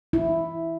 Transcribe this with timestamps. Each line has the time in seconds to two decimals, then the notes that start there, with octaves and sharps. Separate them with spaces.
0.13 E4